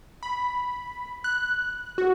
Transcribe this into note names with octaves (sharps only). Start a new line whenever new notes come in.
B5
F#6
F#4